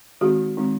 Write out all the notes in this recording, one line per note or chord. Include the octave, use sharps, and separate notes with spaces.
D#3 G#3 C4 D#4 F#4 G#4
D#3 G#3 C4 D#4